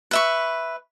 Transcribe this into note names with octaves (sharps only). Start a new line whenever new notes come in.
B4 E5 C#6